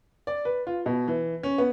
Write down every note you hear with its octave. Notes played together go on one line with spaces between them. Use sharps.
D5
B4
F4
B2
E3
C#4
B3